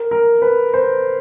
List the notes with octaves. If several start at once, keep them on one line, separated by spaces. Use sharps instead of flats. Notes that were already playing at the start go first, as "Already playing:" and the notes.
Already playing: A#4
A#4
B4
C5